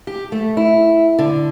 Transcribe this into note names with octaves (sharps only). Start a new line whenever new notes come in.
G4
A3
E4
D3